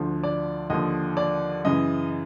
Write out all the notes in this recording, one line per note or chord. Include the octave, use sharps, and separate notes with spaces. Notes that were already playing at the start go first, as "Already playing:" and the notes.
Already playing: D2 D3 F3
D5
D#2 D3 F3 D#5
D5
F#2 C#3 E3 D#5